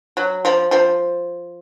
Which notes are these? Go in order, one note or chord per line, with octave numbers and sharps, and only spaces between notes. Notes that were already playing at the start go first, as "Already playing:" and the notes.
F#3
F3
F3